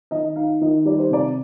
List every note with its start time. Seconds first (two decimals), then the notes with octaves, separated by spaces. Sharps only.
0.11 D#3 D#5
0.36 D#4 F5
0.61 D#3 D#5
0.85 G3 D5
0.99 C5
1.11 C3 D5